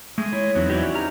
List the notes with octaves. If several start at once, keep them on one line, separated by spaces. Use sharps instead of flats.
G#3 A3
E4 C#5
E2 F#3 C4 C#4 D#4
E3 C#4 E4 F#4 G4 C#5 D5
D#4 G4 A#5 F6